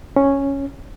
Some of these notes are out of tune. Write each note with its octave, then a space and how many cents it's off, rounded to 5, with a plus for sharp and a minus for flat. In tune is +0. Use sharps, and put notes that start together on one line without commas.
C#4 -5